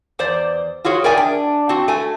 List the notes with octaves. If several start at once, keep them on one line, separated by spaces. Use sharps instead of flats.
E2 C5 D5
F4 F#4 G#4 C#5
G#4 A#4 D5 E5 G5 G#5
D4
C4 F#4
A3 G#5